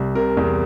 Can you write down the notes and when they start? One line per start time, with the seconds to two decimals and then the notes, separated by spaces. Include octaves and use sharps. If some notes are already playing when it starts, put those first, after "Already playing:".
Already playing: C2
0.15 C3 A#4
0.37 E2